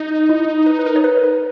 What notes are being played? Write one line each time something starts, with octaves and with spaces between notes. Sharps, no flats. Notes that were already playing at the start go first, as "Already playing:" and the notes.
Already playing: D#4
E4
B4
B4
A#4
C#5
B4
A#4
B4